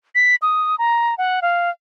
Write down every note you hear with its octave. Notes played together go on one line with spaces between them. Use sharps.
B6
D#6
A#5
F#5
F5